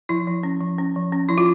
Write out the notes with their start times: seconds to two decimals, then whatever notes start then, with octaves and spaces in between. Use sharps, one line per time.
0.09 F3 E4
0.27 F3
0.43 C#4
0.61 F3
0.78 C#4
0.96 F3
1.12 C#4
1.29 F3 E4
1.38 F4